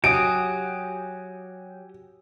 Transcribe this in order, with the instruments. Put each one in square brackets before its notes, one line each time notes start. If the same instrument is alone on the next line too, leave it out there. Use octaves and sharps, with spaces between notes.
[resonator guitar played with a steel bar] F#3 [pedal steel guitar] G4 G#5 D#6 [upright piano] D7